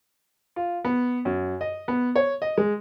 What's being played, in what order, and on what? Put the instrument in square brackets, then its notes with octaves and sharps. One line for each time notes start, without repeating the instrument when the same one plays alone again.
[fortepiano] F4
B3
F#2
D#5
B3
C#5
D#5
G#3